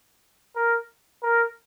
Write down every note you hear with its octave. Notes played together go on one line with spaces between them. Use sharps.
A#4
A#4